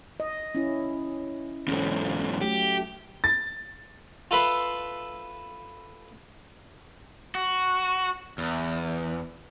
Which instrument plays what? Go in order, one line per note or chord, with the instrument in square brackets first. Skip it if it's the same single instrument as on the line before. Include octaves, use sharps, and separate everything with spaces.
[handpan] D#5
C#4 E4
[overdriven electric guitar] E2 G#2 [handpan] C#4 A4
[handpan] F#3 A3 F#4 [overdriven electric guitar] G4
[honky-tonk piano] A6
[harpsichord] F4 A4 B4 E5 B5 C6
[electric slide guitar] F#4
E2